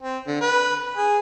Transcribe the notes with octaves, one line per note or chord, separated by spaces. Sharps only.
C4
D3
B4
G#4